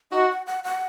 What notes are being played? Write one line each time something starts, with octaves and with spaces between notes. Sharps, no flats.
D#4 F#4 D#5
F#5
F#5
F#5